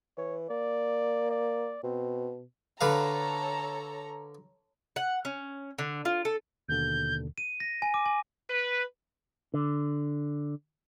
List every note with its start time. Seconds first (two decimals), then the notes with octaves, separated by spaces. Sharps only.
0.17 E3 C#5
0.50 A#3 D5
1.31 D5
1.84 B2 C4
2.81 D3 A4 B4 C#5 F5 A#5
4.96 F#5
5.25 C#4
5.78 D3
6.05 F4
6.25 A4
6.69 D#2 B2 D3 G6
7.38 D#7
7.60 A#6
7.82 G#5
7.94 D6
8.06 G#5
8.50 B4
9.54 D3